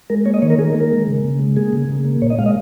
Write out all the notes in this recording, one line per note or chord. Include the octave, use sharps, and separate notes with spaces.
G#3 A#4
A#3 C#5
D#5
D#3 C#5
A#4
D#3 G#4
A#4
A#3
A#4
G#3
C#3
C#3
G#3
A#3 G#4
C#3
C#3
A#3
A#2 C#5
D#5
G#3 F5
D#5